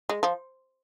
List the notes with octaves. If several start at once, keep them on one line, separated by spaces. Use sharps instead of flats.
G#3
F3